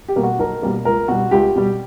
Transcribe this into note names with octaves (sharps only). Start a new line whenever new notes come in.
G4
B2 G3 A#3
F#4
B1 A#4
B2 G3 A#3
C#2 A#4
B2 G3 F#4
C#2 G4
B2 G3